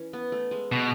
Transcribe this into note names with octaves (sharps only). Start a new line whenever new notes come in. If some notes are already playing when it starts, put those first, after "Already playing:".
Already playing: E3 C#4
B3
A3
G#3
B2